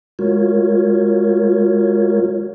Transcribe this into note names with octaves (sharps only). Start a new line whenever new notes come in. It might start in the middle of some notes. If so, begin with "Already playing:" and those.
G#3 F4 F#4 A#4 C#5